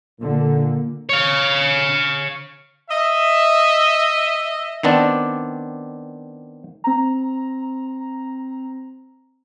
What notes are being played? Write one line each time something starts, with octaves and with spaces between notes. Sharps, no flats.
A#2 D3 A#3
C#5 F5
D#5 E5
D#3 B3 C4 D4 D5
C4 A#5